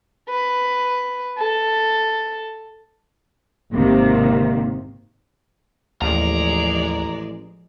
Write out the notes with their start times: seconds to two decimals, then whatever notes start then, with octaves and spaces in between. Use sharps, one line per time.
0.29 B4
1.38 A4
3.72 G#1 C3 D#3 A#3
6.02 A1 D#2 F3 G#3 D5 A#5